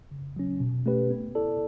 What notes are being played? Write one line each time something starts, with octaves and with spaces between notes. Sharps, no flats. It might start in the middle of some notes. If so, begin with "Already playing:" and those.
C#3
F#3 C#4
B2
A3 C#4 G4 B4
B3
E4 A4 D5